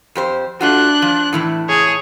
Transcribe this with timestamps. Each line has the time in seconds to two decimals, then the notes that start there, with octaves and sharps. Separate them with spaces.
0.15 F2 G4 C5
0.61 A3 D4 F4 F#4 F#6
1.02 F3
1.33 A2 E3 E4
1.69 G#4 C#5